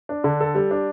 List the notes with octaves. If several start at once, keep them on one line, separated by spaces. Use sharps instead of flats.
D4
D3
A4
G3
D4